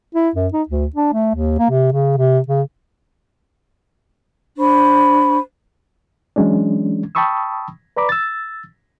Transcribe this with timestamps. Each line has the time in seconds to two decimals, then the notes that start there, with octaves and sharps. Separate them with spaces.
0.15 E4
0.35 F#2
0.53 D#4
0.69 D2
0.96 D4
1.13 A3
1.35 D#2
1.59 A#3
1.70 C3
1.93 C#3
2.17 C3
2.48 C#3
4.59 D4 C5 B5 C#6
6.36 E3 F#3 G#3 C#4 D4
7.15 G5 A5 B5 C#6 D#6 E6
7.97 B4 D5 A#5 B5 D6
8.09 E6 A6